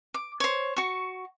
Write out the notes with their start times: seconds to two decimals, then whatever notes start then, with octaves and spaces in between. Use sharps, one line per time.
0.14 D6
0.40 C5 C#5
0.77 F#4 C#6